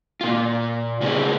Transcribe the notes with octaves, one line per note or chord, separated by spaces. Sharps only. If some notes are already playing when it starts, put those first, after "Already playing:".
A#2 F4
C#3 A3 C4 G4 G#4